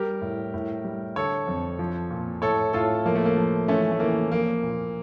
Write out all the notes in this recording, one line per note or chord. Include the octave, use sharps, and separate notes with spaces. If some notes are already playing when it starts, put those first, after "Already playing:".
Already playing: G3 G4 A#4
A2
A2
G3
D3 A4 C#5
F2
F3
A#2
A2 A4 C#5
A2 F4 A4
F3 A#3
A3
A#3
F3
E3 A3 C#4
A3
E3 A#3
F3 A#3
A#2